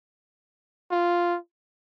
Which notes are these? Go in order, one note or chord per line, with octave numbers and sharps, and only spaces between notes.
F4